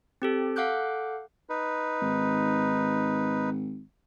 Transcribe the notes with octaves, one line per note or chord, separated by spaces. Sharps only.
C4 G4 A4
A4 F5 F#5 D6 F#6 G6
D#4 B4
G#1